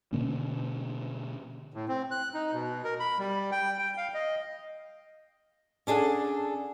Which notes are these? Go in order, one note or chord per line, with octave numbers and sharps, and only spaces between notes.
B2 D3 A#3 C#4
A2
C4
F#6
D#4
B2
A#4
B5
G3
G5
G5
F5
D#5
C#4 D4 G#4 A4 F#5